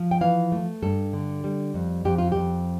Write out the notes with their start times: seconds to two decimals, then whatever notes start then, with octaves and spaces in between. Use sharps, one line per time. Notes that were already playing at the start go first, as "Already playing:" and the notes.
Already playing: F3
0.11 G5
0.21 E3 F5
0.52 A3
0.83 G2 A4
1.13 D3
1.44 G3
1.74 F2
2.05 F2 G4
2.18 F4
2.32 F2 G4